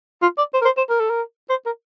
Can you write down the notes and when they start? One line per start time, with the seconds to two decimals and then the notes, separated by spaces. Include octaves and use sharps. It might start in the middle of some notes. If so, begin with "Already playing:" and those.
0.22 F4
0.38 D5
0.54 C5
0.62 A#4
0.65 C5
0.77 C5
0.89 A#4
1.00 A4
1.10 A#4
1.50 C5
1.66 A#4